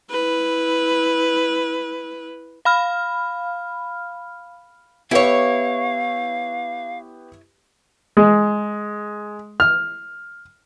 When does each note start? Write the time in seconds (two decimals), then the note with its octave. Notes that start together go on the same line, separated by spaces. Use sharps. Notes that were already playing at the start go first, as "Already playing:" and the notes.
0.11 E4 B4
2.65 F5 B5 F6
5.11 B3 E4 G4 B4 C#5 F5
8.17 G#3
9.60 F6